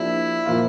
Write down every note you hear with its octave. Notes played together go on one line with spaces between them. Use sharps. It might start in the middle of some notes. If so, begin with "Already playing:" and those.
Already playing: F3 A#3 D4 E4 G4
A#2 F3 A#3 F4